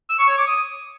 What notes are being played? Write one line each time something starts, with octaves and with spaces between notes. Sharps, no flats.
E6
C#6
C#5
D6
D#6